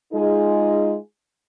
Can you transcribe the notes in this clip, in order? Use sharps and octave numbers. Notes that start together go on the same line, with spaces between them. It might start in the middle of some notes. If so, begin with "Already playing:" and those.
G#3 D#4 F4 G#4